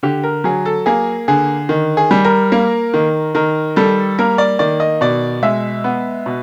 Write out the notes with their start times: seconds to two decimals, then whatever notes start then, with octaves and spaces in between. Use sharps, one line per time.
0.03 D3 G4
0.24 A#4
0.44 F#3 G#4
0.65 A4
0.86 A#3 G#4
1.28 D3 G#4
1.69 D#3
1.97 G#4
2.11 G3
2.25 A#4
2.52 A#3
2.94 D#3
3.35 D#3 A#4
3.76 G3 A4
4.19 A#3 A#4
4.38 D5
4.59 D#3 D5
4.80 D#5
5.01 B2 D5
5.43 G#3 E5
5.84 B3
6.26 B2